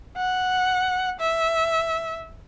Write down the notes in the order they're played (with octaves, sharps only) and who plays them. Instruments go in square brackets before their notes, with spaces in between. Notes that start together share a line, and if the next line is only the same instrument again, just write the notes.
[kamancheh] F#5
E5